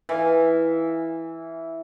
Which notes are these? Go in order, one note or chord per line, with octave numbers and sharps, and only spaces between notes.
E3 F5